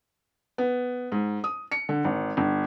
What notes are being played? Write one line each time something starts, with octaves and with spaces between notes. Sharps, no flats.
B3
G#2
D#6
C#7
D3
G#1
G1